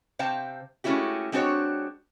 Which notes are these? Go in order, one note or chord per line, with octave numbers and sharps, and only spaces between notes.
C3 C5 F5 G5 A5
G#3 A3 C#4 E4 F#4 G4
G#3 C4 D4 F#4 C5 C#5